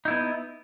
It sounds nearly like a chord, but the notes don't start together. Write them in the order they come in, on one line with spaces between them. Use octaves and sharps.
D#4 E4 B3